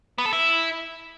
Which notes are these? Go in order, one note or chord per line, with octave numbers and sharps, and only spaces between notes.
B3
A4
E4